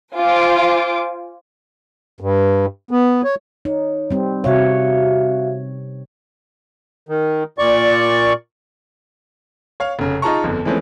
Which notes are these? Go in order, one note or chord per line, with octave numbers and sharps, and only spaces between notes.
F4 C5 G#5 D6
G2
B3
C#5
D#4 C#5
G3 C4
C3 F#4 C#5 E5 F5
D#3
A#2 D5 C#6
C#5 F5
F1 C#3
D#4 F4 G#4 A5 A#5 C#6
G1 F2 D3
E3 F3 G#3 A3 C4 C#4